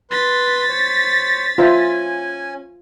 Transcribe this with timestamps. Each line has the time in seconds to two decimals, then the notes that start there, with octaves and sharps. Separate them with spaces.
0.11 B4 C6 A6 B6
0.69 C5 C#5
1.58 C#4 F4 C5 E5 G#5